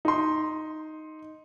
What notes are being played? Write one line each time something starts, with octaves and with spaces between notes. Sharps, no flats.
D#4 C6